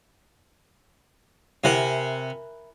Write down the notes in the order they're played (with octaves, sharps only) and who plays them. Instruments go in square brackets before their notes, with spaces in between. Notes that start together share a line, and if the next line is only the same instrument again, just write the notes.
[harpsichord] C3 F#5 [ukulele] E4 A#4 G#5